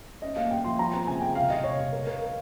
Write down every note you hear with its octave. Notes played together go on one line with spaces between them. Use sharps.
C#4 D#5
A#3 F5
A#3 G5
F3 C6
F3 A#5
C4
C#3 G#5
C#3 G5
C3 F5
C3 D#5
C3 C#5
C3
A#4
A#4
A#4